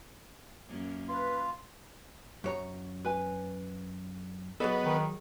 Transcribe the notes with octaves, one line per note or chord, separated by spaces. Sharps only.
F#2 A#3 C#4
F4 B4
F#2 C#5 A#5
B4 G#5
F#3 B3 G#4 A4 D#5
D#3